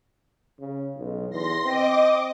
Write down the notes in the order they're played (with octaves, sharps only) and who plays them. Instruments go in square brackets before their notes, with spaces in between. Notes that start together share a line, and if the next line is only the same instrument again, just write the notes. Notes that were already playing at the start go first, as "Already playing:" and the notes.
[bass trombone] C#3
B1
[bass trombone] E2 [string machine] C6 A#6
[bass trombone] C4 [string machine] D#5 D6